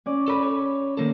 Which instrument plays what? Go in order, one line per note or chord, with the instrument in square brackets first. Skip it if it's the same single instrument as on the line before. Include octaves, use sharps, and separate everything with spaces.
[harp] C#4 D5
[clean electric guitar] A4 B5
C#5
D#3 A#3 A4